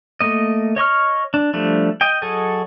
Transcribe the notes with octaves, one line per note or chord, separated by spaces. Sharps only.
A3 A#3 D#5
C#5 D#5 C#6 F6
D4
F3 G3 A3 D4
D#5 G5
F#3 G#4 A4 D#5